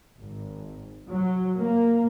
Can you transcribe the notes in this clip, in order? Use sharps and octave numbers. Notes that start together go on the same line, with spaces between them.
G#1
F#3
A#3